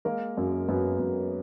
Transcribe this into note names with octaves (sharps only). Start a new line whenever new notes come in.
G#3 A#3 A#4
F#2
F#2 B3 B4
F#2